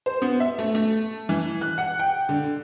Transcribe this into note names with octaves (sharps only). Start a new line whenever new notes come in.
C5
B3
E5
A3
A3
E3
F#6
F#5
G5
D3